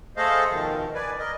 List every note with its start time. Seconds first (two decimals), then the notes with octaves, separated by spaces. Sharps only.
0.17 A3 G#4 A4 C5 D#5 F5
0.50 B2 D#3 F3
0.95 B4 D5 G#5
1.19 A#4 D#5